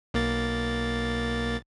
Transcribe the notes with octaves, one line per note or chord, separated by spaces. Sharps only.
B1 A#3 A6